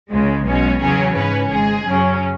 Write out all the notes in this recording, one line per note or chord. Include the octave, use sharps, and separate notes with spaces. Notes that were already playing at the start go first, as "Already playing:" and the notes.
C#2 C#3 G#3
B1 B2 G#3 C#4
E2 C#3 F#3 C#4 G#4
G#2 E3 C#4 B4
G#1 G#2 G#3 G#4
F#2 C#3 F#3 C#4